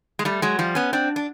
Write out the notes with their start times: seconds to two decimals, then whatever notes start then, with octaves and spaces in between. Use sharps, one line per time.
0.19 G#3
0.25 G3 A3
0.42 F#3 G#3
0.59 F3 G3
0.75 B3 C#4
0.93 C4 D4
1.16 D4